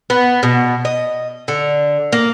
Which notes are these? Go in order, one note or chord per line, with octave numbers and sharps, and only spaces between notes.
B3
B2
D#5
D3
A#3